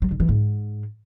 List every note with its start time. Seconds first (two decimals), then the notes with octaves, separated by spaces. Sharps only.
0.02 F#3
0.11 D3
0.20 E3
0.29 G#2